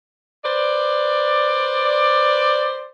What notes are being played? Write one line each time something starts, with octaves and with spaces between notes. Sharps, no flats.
B4 C5 D5